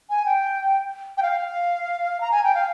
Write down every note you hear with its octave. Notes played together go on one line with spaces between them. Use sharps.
G#5
G5
G5
F5
A#5
G#5
G5
F5